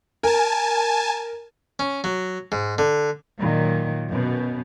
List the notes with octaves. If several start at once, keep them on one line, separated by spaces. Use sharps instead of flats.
A#4 G#5 A5
C#4
F#3
G#2
D3
A#2 D#3 F#3
F#2 B2